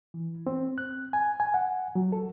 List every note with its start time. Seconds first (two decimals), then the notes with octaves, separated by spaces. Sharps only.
0.14 E3
0.47 C4
0.78 F#6
1.13 G#5
1.40 G#5
1.54 F#5
1.95 F#3
2.12 A4